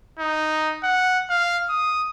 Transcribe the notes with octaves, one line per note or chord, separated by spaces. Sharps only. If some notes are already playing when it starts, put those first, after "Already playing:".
D#4
F#5
F5
D#6